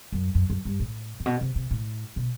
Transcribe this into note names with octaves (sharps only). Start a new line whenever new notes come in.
F#2
F#2
F#2
G2
A2
A2
B2
C3
C3
A2
B2